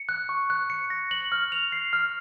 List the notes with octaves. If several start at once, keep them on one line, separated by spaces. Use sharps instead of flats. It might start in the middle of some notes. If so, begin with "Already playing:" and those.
Already playing: C#7
F#6
C#6
F#6
C#7
A#6
F#7
F6
F7
C7
F6